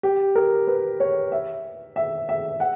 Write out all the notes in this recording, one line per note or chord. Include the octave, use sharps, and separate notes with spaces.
G4
A#4
B4
C#5
E5
E5
E5
F#5